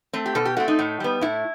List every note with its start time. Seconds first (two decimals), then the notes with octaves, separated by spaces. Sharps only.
0.13 A3 C4
0.26 G4
0.35 B2 A4
0.45 G4
0.57 A3 C4 F#4
0.68 D#4
0.79 A2
1.00 G3 B3
1.21 A2 E4